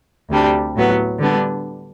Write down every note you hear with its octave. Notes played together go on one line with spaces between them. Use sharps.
D2 C3 G3 D4
A2 F#3 B3
D3 G3 B3 D4